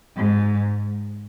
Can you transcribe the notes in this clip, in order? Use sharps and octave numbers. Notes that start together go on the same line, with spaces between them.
G#2